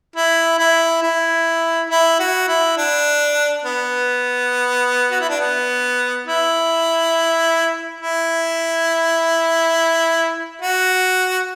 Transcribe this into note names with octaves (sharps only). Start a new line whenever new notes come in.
E4
E4
E4
E4
F#4
E4
D4
B3
F#4
E4
D4
B3
E4
E4
F#4